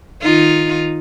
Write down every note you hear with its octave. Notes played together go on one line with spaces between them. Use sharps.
D#3 D#4 F4